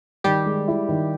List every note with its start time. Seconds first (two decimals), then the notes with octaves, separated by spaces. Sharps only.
0.24 D#3 G3 G4
0.46 G#3
0.68 E4
0.89 D#3